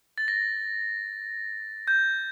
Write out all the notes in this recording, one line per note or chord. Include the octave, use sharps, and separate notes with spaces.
A6
A#6
G6